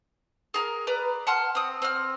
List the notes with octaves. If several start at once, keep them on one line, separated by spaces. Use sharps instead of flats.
G#4 A#4
B4 D5 A#5
F#5 A5 C6 F6
C4 D#6
C4 F6